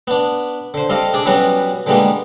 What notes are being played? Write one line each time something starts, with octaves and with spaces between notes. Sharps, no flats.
B3 D4
D3 C5
G3 C4 A4 D#5 F5
D4 G#4 D5
E3 F#3 G3 B3 C#4 F#4
D3 E3 G3 G#3 A#3 B3